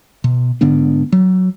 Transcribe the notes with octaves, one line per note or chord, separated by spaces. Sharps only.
B2
G#2 D3 B3 D4
F#3